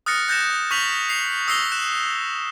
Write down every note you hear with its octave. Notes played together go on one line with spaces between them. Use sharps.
D#6 F6 F#6 A6 A#6 C#7
F#6 G6 A6 A#6 C#7 E7
C#6 F6 G6 B6 F7 F#7
C7 F7
D#6 E6 A#6 C7 F7 G7
F#6 E7